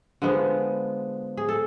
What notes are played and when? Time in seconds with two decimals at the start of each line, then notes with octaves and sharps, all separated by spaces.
0.22 D3 F3 G#3 B3
1.37 G#4
1.49 A4